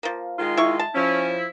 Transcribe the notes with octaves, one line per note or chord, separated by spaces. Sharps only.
F3 A#3
D#3 G#3 F4
E4 C#6
A5
F3 C#4 E4